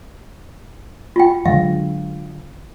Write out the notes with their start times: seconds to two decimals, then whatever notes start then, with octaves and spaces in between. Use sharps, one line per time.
1.16 F4 G5
1.46 D3 F#3 G#3 F5